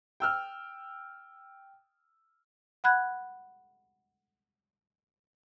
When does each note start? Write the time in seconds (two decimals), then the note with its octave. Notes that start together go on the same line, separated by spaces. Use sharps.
0.20 G5 E6 F6
2.84 F#5 B5 F#6 G#6